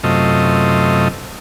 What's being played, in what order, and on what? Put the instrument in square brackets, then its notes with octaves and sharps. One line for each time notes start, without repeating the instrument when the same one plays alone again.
[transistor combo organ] F#2 C3 A3 F4 D#5